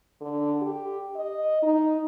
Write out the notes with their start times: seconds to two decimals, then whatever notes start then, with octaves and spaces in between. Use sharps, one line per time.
0.21 D3
0.62 G4
1.16 D#5
1.63 D#4